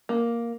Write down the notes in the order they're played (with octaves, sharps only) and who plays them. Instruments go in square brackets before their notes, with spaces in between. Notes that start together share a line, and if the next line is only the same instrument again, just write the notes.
[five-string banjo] A#3